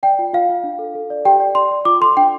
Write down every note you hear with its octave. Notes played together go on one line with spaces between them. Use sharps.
D5 G5
F4
F4 F5
F4
D4
A4
A4
D5
G4 G5
D5
D5 C6
D5
F4 D6
A4 C6
D4 G5